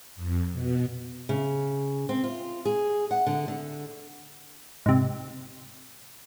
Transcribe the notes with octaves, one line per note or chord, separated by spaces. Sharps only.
F2
B2
C#3
C4
F4
G#4
F#5
D3
D3
G#2 C3